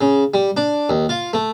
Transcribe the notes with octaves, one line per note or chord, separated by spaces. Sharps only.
C#3
G3
D4
D#2
F4
A3